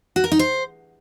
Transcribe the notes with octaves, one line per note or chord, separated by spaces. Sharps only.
F#4
A#4
D#4
C5